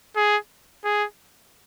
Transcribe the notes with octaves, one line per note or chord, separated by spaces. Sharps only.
G#4
G#4